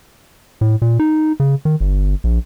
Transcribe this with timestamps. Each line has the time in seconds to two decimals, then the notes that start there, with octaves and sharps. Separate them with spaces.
0.61 A2
0.82 A#2
0.99 D#4
1.40 C#3
1.65 D#3
1.80 G1
2.24 A#1